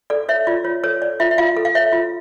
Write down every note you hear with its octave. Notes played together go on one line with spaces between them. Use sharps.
A4 D5
C#5 E5
F4 D5
F4 C#5
A4 C#5
C#5 D5
F4 E5
E5
F4 F5
A4
F5
C#5 E5
F4